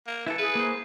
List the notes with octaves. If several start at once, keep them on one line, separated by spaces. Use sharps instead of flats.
A#3
E3 E4 A4
G#4 B4
A#3 C5